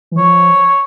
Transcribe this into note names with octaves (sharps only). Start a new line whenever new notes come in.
E3
F3 C#5